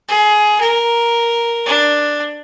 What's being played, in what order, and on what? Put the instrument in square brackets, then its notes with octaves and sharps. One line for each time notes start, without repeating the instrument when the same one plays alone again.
[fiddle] G#4
A#4
D4